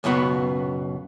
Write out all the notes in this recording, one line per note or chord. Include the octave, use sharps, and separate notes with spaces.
C#2 F#2 B2 B3 F#4